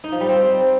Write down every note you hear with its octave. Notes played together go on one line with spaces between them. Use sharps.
D#4
F3
G3
C4